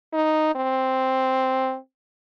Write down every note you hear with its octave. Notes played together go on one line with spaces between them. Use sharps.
D#4
C4